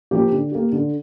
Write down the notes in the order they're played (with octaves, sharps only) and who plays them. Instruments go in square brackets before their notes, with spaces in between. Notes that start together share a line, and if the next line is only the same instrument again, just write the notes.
[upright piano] F3 A#3 G4
D3
A#3 G4
D3